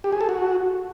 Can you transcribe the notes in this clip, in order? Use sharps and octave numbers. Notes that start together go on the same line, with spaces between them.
G4
G#4
A4
F#4